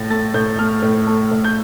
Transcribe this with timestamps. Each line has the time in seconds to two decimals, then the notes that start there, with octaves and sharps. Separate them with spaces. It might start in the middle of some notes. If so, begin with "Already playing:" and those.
Already playing: A2 A3 A6 A#6
0.10 A3 A6
0.34 A2 G6
0.59 A3 F6
0.83 A2
1.07 A3
1.31 A2
1.44 G6